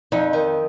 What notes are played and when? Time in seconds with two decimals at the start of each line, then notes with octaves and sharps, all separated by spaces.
0.12 F2 D#4
0.33 D#3